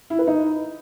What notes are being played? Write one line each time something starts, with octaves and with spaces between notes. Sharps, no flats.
E4
B4
D#4